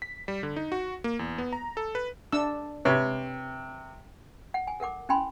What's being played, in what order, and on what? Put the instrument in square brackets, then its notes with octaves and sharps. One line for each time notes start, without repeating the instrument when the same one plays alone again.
[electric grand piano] B6
G3
D3
D#4
F#4
A#3
E2
B3
A#5
A4
B4
[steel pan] D4 E6
[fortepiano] C3 [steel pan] B4 C#5
[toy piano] F#5
G#5
A4 A#4 F#5 D6
C#4 E4 G5 G#5 B5 C6